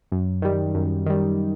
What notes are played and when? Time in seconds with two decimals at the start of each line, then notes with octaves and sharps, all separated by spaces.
0.12 F#2
0.42 D#3 G3
0.75 F#2
1.06 D#3 G3